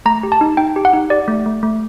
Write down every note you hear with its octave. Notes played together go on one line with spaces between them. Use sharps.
A3 A#5
G4
A5
D#4
D#4 G5
G4
F#5
D#4
G4 D5
A3
A3
A3